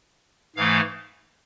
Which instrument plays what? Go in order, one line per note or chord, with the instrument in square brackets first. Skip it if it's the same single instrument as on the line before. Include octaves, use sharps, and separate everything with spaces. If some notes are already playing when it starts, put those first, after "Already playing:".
[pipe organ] G#2 E3 A3 F5